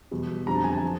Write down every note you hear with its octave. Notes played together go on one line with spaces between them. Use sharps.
E2 B2 G3
F2 D3 G3 A#5
A5
G#5
A5
F3